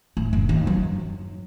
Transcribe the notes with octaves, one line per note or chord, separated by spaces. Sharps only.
A2
F#1
D#2 D#3
F#3